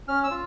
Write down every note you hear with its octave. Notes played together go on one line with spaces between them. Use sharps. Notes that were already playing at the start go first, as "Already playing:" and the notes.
C#4 F6
E6
F4